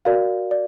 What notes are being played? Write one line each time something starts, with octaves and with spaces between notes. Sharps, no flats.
F#4 A#4 D5 F5
D5